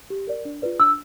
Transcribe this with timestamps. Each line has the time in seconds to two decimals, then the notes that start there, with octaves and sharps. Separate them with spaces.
0.10 G4
0.27 A#4 D5
0.45 D4
0.62 F4 G#4 B4 D5
0.79 D4 E6